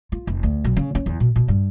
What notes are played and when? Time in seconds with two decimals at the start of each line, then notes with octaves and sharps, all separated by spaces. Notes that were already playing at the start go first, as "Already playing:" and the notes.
0.12 F4
0.27 F1
0.43 D2
0.64 B1
0.77 C#3
0.95 C#4
1.06 E2
1.20 B2
1.36 B2
1.48 G2